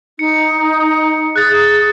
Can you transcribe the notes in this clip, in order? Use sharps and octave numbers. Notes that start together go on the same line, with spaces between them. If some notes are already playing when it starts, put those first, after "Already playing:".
D#4 C#7
G#4 F#6 A6